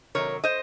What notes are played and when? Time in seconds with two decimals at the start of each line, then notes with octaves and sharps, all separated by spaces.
0.15 C3 D#3 F#3 A#4 C#5
0.44 C5 D#5